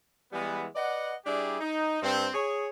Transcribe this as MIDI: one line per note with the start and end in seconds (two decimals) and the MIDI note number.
0.33 0.66 52
0.33 0.66 55
0.33 0.66 56
0.33 0.66 59
0.76 1.14 71
0.76 1.14 74
0.76 1.14 75
0.76 1.14 78
1.26 1.60 55
1.26 1.60 62
1.26 1.60 64
1.26 1.60 67
1.26 1.60 68
1.60 2.02 63
2.02 2.28 43
2.02 2.28 60
2.34 2.69 68
2.34 2.69 73